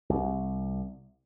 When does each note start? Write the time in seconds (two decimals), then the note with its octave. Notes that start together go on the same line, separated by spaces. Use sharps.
0.10 C2